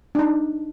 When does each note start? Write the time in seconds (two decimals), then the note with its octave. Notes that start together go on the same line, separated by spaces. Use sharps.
0.15 D4
0.19 D#4